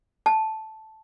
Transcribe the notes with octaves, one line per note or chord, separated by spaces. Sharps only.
A5